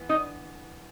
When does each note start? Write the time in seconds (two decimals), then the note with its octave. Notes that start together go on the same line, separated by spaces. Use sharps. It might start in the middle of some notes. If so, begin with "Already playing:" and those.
Already playing: E3 B3
0.09 D#4